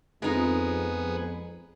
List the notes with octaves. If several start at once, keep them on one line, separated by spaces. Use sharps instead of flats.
F2 G#3 B3 D#4 G#4